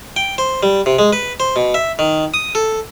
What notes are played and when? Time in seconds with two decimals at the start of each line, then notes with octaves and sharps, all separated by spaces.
0.16 G5
0.38 C5
0.63 G3
0.86 C3
0.99 G#3
1.13 B4
1.40 C5
1.56 B2
1.74 E5
1.99 D#3
2.34 D#6
2.55 A4